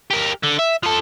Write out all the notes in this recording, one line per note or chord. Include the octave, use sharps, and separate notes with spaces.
G4 A#4
D3
E5
F3 A4